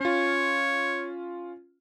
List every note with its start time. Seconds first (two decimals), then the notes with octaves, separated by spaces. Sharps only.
0.01 C#4 F4 C#5